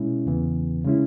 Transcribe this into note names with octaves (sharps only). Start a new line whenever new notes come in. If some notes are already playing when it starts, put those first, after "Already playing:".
Already playing: B2 G#3 C#4 E4
E2 C#3 E3 B3
C#3 G#3 C#4 E4